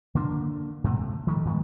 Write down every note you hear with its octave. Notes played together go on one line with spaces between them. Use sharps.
D3 A#3 D4
G#2 C3 A3
D#3 F3 A3
G2 D#3 G#3 B3